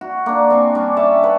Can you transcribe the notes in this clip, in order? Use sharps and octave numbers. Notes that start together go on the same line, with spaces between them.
F#4
A#3 D4
C4 G#5 C#6
G3 C#4 D4
C#5 E5 G5 A5
B4